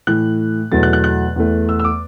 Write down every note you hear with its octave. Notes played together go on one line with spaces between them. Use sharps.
A2 E3 A3 F#6
E2 B2 F#3 A3 A6
F#6
F#6
F#6
E2 E3 A3
E6
E6
D6